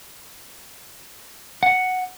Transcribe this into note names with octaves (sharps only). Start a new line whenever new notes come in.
F#5